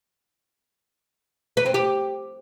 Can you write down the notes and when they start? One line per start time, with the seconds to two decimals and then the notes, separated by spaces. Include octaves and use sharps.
1.57 B4
1.66 C4
1.74 G4